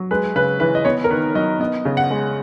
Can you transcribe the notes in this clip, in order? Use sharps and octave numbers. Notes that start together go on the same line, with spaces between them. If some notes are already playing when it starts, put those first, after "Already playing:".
Already playing: F#3
G#3 B4
C#3 B4
E3 B4
D#5
B3 C#5
A#4
D#3 B4
F#3 D#5
B3 D#5
C#3
F#5
G#3